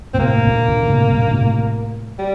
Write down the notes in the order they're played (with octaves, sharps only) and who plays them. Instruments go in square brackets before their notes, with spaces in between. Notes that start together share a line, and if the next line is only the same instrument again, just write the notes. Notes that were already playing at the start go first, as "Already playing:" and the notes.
[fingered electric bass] A#2 [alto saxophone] C4
[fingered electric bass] A2 C3 [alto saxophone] A#3
[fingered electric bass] A#2 D3
A#2 D3
D3
A2 C3
G2 A#2
D3
A2 C3
[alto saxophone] G3